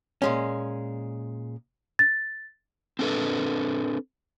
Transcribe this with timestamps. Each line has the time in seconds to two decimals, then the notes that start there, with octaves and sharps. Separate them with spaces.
0.22 A#2 G#3 C#4
1.99 A6
2.99 C4 D4 A4 B4